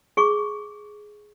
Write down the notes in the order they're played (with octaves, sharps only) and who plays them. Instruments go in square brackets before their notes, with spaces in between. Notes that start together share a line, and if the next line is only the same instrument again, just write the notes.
[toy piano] G#4 C#6